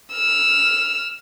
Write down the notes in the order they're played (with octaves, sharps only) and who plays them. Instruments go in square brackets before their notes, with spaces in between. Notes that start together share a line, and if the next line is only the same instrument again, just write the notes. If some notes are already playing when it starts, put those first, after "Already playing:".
[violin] E6 F6